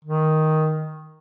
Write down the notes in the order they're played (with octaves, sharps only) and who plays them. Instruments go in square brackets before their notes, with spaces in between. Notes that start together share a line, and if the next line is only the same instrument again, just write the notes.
[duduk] D#3